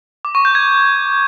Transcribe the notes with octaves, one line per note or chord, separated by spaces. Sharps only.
D6
C#6
G6
G#6